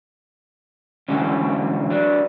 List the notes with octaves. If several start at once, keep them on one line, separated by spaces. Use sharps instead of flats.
D3 E3 F#3 G#3 C#4
F#3 D4